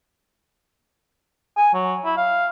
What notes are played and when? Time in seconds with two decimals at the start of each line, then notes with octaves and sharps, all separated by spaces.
1.57 G#5
1.74 F#3
2.05 E4
2.17 F5